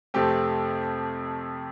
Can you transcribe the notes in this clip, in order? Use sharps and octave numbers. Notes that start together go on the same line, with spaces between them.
F2 C3 A3 C4 G4